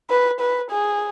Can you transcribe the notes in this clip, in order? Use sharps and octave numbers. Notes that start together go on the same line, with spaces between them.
B4
B4
G#4